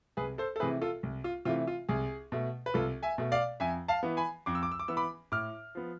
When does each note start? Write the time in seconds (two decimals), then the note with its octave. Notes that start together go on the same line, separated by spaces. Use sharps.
0.17 C2 G#4 B4
0.38 A4 C5
0.56 A4
0.60 C3 E3 A3 G#4 B4
0.82 F4 A4
1.03 C2
1.24 F4
1.45 C3 E3 A3 F4
1.67 F4
1.89 C2 G#4
2.32 B2 A3
2.66 B4
2.74 C2 F4 A4
3.03 E5 G#5
3.18 B2 A3
3.32 D5 F5
3.60 F2 E5 G#5
3.88 F5 A5
4.03 E3 B3
4.17 G#5 B5
4.46 F2 D6
4.55 E6
4.63 D6
4.71 E6
4.80 D6
4.88 E3 B3 E6
4.97 B5 D6
5.32 A2 D6 F6
5.75 F3 B3